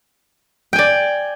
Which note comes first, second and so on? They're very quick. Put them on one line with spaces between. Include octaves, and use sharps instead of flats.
G5 G#5 D5